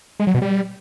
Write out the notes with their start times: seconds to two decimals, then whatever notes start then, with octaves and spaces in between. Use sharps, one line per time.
0.20 G#3
0.27 F#3
0.34 B2
0.42 G3